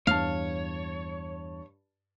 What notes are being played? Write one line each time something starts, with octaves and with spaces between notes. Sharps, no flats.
E2 G2 C#5 F5 A5